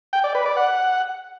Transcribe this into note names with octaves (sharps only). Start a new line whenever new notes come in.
G5
D5
B4
D5
F#5